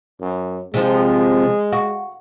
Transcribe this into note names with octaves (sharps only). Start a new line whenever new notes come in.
F#2
C3 F3 G#3
F#4